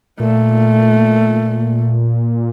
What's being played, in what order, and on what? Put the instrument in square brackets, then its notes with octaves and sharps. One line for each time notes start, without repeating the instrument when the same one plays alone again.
[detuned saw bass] A#2 [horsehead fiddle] A3